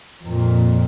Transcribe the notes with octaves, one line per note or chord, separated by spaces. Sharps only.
F2 A#2